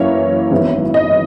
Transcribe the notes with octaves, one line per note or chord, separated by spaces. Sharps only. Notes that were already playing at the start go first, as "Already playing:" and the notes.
Already playing: F#2 E3 A#3 C#4 C#5
G#1 F#2 E3 B3
D#5